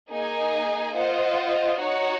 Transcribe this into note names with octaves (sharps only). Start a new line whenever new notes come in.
A#3 D#4 G#4 D#5 G#5
F4 C5 D#5 F#5
D#4 F#4 C#5 F#5